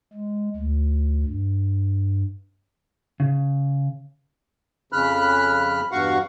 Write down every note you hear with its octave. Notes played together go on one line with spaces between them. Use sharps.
G#3
D2
G2
C#3
F2 C#3 B5 F6 F#6
E2 G2 F#4 F5 F#5 C#6